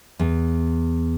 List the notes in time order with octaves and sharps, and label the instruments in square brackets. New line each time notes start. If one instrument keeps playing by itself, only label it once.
[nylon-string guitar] E2